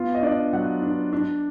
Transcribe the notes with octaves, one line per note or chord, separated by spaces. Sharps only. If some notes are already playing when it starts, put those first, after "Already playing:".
Already playing: B3 F4
D#5
D4 D5
F#3 F#5
D4
D4